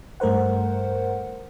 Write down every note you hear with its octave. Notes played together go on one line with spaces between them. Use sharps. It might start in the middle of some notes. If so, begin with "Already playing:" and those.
G2 A3 A#4 C5 F#5